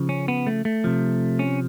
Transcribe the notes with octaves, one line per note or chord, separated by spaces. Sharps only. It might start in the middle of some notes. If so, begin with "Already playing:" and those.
Already playing: C#3 F3
C#4
B3
A3
A3
C3 F3
C#4